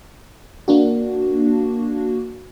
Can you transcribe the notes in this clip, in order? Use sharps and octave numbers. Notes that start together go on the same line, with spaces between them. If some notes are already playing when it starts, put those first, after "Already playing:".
A#3 D4 F#4